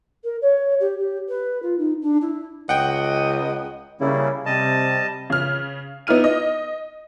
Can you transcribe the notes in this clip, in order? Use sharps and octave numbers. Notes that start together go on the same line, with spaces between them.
A#4
C#5
G4
G4
B4
F4
D#4
D4
E4
C#2 D#5 F#5 G5
C#3 G3 A#3 E4
C3 G3 D#5 A5
C#3 F6
B3 D#4 E4 F6 D#7
D#5